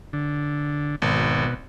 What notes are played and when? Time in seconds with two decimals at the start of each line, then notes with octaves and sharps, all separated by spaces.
0.13 D3
1.02 G#1 B2